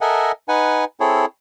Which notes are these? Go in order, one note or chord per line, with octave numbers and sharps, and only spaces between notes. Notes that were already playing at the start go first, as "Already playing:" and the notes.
A4 A#4 D#5 E5 F#5 G#5
D#4 B4 F#5 G#5
C4 E4 G#4 A4 C#5